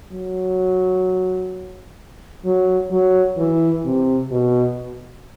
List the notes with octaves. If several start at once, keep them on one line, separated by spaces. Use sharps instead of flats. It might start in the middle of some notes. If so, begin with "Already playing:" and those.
F#3
F#3
F#3
E3
C3
B2